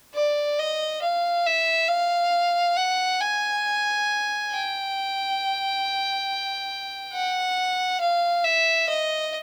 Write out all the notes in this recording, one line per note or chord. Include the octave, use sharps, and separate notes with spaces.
D5
D#5
F5
E5
F5
F#5
G#5
G5
F#5
F5
E5
D#5